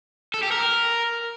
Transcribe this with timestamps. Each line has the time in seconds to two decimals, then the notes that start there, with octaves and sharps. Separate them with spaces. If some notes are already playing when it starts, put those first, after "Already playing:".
0.34 A4
0.43 G4
0.52 A#4